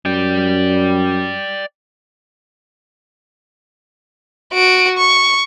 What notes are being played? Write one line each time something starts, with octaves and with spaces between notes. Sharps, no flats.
F#2 D5 G5
F#4 D7
C#6